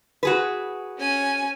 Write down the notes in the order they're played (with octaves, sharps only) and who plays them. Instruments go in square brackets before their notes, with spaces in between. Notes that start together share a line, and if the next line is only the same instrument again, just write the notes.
[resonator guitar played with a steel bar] F#4 G#4 B4
[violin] C#4 G#5